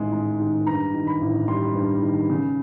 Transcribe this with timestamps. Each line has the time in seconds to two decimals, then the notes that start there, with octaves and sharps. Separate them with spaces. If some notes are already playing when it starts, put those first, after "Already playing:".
Already playing: A1 G#2 D#3 G#3
0.12 G#2
0.40 D#3
0.67 G2 A#5
0.94 D#3
1.07 B5
1.21 A1
1.48 G3 C6
1.75 G2
2.02 D#3
2.29 C#3